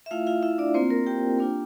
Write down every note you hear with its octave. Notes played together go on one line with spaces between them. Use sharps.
E5
A3 E4 F4 F5
F4 F5
E4 E5
D4 D5
A#3 C4 F4 C5
A#3 A#4
G4 G5
A#3 D4 F4